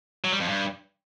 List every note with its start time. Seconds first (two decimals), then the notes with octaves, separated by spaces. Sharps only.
0.24 F#3
0.32 G3
0.40 F2
0.48 G2